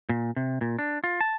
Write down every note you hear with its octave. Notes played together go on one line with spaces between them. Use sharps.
A#2
C3
A#2
D4
F4
A5